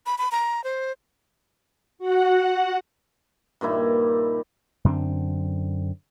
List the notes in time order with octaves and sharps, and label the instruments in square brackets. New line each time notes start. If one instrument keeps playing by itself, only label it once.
[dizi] B5
B5
A#5
C5
[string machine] F#4 F#5
[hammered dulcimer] G2 A#2 D#3 E4
[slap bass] F#2 D3 B3 C4